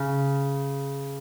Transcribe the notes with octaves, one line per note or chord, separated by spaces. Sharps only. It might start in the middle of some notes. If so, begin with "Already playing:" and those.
Already playing: C#3